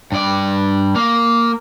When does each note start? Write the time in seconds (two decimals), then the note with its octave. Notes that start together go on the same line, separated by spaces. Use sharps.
0.12 G2 D5
0.96 A#3